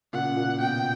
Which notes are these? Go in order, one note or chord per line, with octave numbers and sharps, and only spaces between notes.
A#2 C#3 F#5
A#2
B2 G5